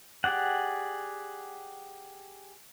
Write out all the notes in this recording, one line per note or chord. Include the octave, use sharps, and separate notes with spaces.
G4 G#4 D5 F#5